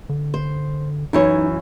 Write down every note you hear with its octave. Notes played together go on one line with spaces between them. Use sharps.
D3
C5
F#2 E3 D#4 C#5